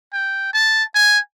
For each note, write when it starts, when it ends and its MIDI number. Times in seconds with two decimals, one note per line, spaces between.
0.13 0.50 79
0.53 0.84 81
0.95 1.19 80